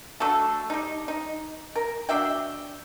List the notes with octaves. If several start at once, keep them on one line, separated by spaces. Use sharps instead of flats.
A3 D4 F#4 A4
G3 D#4
D#4
A#4
D4 F#4 E5 G5